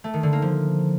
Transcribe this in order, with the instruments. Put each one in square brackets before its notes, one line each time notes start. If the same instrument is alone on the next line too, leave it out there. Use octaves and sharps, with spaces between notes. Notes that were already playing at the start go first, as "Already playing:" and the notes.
[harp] A3
D#3
D3
A#3
F3